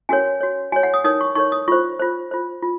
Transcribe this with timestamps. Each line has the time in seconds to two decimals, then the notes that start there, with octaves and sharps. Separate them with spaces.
0.09 C#4 F#4 A#4 C#5 G#5
0.41 F#4 C#5
0.72 F#4 C#5 G#5
0.83 F#5
0.94 D#6
1.04 D#4 A#4 C#5 D#6
1.21 C#6
1.35 D#4 A#4 C#5 C#6
1.52 D#6
1.68 F4 C5 C#6
1.99 F4 C5
2.31 F4 C5
2.63 F4